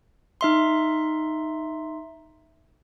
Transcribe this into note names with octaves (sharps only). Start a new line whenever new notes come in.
D#4 E5 C6